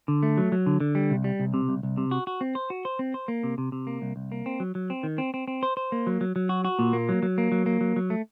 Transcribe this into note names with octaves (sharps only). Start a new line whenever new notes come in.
D3
A3
F#3
F#3
D3
D3
G3
C2
G3
C2
C3
C2
C2
C3
F#4
F#4
C4
C5
F#4
C5
C4
C5
A#3
C3
C3
C3
A#3
C2
C2
A#3
C4
F#3
F#3
C4
D#3
C4
C4
C4
C5
C5
A#3
F#3
F#3
F#3
F#4
F#4
A#2
A#3
F#3
F#3
A#3
F#3
A#3
F#3
F#3
A3